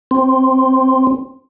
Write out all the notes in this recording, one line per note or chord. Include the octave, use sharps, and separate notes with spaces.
C4